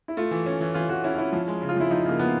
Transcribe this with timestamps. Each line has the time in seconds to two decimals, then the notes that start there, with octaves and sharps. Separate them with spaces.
0.08 E4
0.17 A3 F4
0.31 E3
0.46 C#4
0.61 E3
0.74 E3 F4
0.89 E3 F#4
1.04 C#4 E4
1.18 C#4 E4
1.33 F3
1.48 G#3
1.62 C#3
1.69 F4
1.76 F3 E4
1.91 F3 D#4
2.05 C#3 A#3
2.19 F3 B3